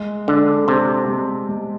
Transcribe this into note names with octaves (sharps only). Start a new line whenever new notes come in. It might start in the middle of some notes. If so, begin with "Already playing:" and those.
Already playing: G#3
D3 D4
C3 G4
G#3
G#3